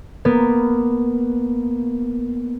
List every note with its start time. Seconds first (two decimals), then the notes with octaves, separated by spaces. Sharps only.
0.25 A#3 B3